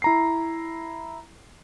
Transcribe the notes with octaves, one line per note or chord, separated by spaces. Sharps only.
E4 A#5 C7